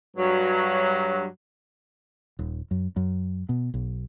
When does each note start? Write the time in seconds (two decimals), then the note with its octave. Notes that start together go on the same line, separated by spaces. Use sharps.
0.17 G2 F#3
2.39 D#1
2.71 F#2
2.96 F#2
3.49 B2
3.74 B1